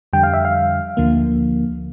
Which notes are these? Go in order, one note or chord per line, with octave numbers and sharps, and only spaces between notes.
F2 D3 G3 G5
F5
E5
F5
D2 D3 F3 A#3